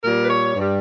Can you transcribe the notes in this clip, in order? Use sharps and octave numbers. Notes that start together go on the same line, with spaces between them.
A#2 G3 A#4
B4
C#5
G2 G3